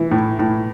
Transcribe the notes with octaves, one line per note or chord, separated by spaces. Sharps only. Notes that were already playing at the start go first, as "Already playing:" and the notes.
Already playing: E3
A2
A2